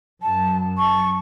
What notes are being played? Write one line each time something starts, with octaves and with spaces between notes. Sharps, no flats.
F#2 F#3 A5
A5 C#6